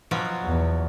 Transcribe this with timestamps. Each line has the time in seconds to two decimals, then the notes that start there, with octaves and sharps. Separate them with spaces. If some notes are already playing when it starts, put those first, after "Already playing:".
0.11 B2 F3 F#3
0.43 E2